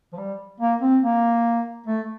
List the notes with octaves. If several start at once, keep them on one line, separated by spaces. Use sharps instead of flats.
F3
G3
A#3
C4
A#3
A3